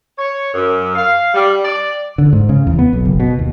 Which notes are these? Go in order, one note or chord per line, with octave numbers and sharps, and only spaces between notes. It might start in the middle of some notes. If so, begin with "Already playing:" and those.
C#5
F#2
F5
G3
D5
D3
G#2
C#3
E2
B3
B1
F#1
B2
D#2